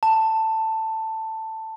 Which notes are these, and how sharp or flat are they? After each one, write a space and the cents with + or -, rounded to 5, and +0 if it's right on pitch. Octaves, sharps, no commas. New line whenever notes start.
A5 +10